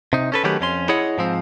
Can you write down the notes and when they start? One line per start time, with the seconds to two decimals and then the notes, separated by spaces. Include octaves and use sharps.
0.13 C3 D#4
0.32 C#4 A4 B4
0.44 D#3 F#3 A3 C#4 G4 B4
0.61 F2 C#4 C6
0.89 E4 G#4 C#5 D#5 F#5
1.18 G#2 F3 C4